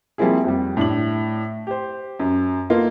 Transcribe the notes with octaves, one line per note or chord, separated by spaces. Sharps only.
F3 G3 A#3 C4 E4 G#4
F2 G3
A2 D4 F#7
G4 C5
F#2
A#3 B3 D#4 F4 A4